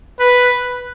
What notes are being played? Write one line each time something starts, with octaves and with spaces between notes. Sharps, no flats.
B4